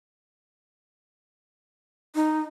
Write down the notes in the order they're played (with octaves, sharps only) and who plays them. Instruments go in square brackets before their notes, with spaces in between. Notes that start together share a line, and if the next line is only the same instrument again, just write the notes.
[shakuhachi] D#4